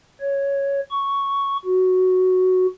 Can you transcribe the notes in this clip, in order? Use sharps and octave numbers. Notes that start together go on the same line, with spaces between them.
C#5
C#6
F#4